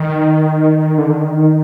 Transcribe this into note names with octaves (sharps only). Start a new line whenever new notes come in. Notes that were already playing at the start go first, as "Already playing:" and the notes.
Already playing: D#3
D3
D#3